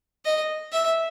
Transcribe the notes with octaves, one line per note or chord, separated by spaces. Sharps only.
D#5
E5